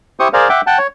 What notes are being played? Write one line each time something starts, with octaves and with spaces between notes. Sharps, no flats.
E4 G4 C5 C#6 D#6
G#4 A#4 C5 D5 F5
E5 F#5 G5 D6
F#5 G5 A5
C#5